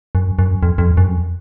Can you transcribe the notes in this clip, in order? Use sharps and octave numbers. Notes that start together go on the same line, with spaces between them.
F#2
F#2
F2
F2
F#2
F2